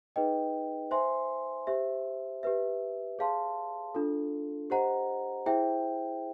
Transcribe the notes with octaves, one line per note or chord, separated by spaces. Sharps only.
D#4 G#4 B4 D#5 G5
C5 E5 G#5 C6
G4 C5 E5
G4 B4 E5
G#4 C#5 F5 A5 C6
D4 F4 A4
G4 C5 D#5 F#5 A#5
E4 G#4 C5 E5 G5